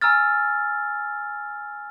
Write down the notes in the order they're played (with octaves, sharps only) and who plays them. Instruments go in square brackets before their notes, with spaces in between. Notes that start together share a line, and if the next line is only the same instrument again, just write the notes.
[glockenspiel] G#5 A#5 E6 F6 A6